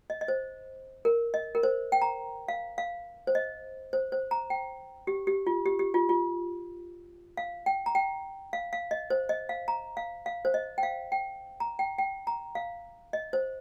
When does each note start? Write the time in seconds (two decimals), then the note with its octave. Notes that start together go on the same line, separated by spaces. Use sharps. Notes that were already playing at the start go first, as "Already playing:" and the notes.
0.10 D#5
0.21 D#5
0.28 C5
1.05 A#4
1.34 D#5
1.55 A#4
1.63 C5
1.92 G5
2.02 A#5
2.48 F5
2.78 F5
3.27 C5
3.35 D#5
3.93 C5
4.12 C5
4.31 A#5
4.50 G5
5.07 G4
5.27 G4
5.47 F4
5.66 G4
5.79 G4
5.94 F4
6.09 F4
7.37 F5
7.66 G5
7.86 A#5
7.95 G5
8.53 F5
8.73 F5
8.91 D#5
9.10 C5
9.29 D#5
9.49 F5
9.68 A#5
9.97 F5
10.26 F5
10.45 C5
10.54 D#5
10.78 G5
10.83 F5
11.12 G5
11.60 A#5
11.79 G5
11.98 G5
12.27 A#5
12.55 F5
13.13 D#5
13.33 C5